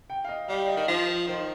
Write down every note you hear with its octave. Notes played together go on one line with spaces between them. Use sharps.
G5
F5
D#5
G3 F5
D#5
D#3
F3 C5
D#3 C5